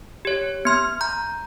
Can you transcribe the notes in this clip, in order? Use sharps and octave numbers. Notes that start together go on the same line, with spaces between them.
G4 C#5
B3 C6 F6
A#5 G6